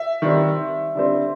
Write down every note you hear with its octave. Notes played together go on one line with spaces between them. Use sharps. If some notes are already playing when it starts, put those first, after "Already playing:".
Already playing: E5
D#3 G3 C4
D3 G3 C4